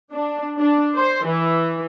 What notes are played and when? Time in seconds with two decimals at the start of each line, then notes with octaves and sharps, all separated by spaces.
0.12 D4
0.59 D4
0.97 C5
1.26 E3